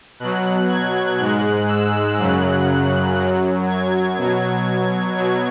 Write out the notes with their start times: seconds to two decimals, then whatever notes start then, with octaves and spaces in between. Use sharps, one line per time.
0.20 B2 F#3 F#6
0.70 G#6
1.19 G#2 G#3 F#6
1.68 E6
2.18 F#2 C#3 F#3 F#6
3.18 F#2 F#3
3.67 G#6
4.17 B2 F#3
5.16 B2 F#3 G#6